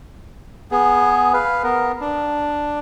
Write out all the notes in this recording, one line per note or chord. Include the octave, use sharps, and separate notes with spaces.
B3 G#4
B4 F5
B3 A#4
D4